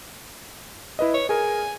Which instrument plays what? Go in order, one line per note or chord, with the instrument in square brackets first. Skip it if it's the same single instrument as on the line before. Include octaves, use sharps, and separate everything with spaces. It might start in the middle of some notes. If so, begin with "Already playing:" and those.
[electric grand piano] E4 B4 D#5
[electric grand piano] B4 [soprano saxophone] C#5
[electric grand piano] G#4 A#4 [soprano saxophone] G#5